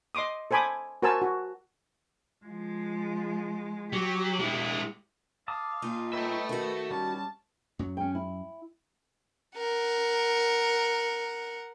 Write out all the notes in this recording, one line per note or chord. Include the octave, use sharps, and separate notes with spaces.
D#5 C6 D6 D#6
A4 C5 G#5 B5 D6 D#6
F#4 A#4 C5 G#5 A5 E6
F#4
F3 G#3
F#3 G4
G#3 E4
F5 A5 D6 D#6
A#2 D#4 F4
A4 B4 C#5 D#5 E5 G5
D#3 F#4
G3 C#4 A5
F#2 F#3
C#4 G5
E4
A#4 F#5